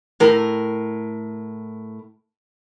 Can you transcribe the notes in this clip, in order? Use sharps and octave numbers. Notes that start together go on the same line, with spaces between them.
A2 A#4